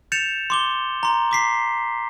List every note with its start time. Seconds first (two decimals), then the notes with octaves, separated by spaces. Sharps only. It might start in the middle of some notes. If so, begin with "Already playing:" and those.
0.12 G6 A6 C#7 E7 F7
0.50 C6 D6 G7
1.03 A#5 C6
1.31 D6 B6 C7